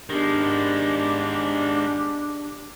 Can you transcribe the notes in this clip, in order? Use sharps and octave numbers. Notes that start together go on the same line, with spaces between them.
D#3 G#3 B3 D4 G4